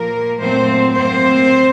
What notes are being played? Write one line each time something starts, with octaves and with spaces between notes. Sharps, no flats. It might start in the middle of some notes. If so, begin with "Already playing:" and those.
Already playing: A#2 F3 A#3 A#4
A#2 F#3 A3 C4 C5
A2 F#3 A#3 C4 C5